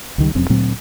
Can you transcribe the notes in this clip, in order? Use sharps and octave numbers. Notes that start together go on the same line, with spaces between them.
C#2 D#3 G3
F1 F#2 C4
D2 A#2 F#3 C4